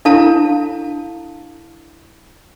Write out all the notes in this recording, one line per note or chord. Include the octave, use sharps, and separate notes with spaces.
D4 E4 A4 F5 A5 A#5